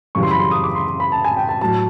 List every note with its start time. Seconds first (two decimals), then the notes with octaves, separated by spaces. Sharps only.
0.15 F#2 C#3 E3 G3 C#6
0.23 C6
0.31 B5
0.39 C6
0.51 D#6
0.64 D6
0.75 C6
0.88 C6
1.00 B5
1.12 A5
1.25 G#5
1.37 G5
1.49 A5
1.61 A2 F#3 A5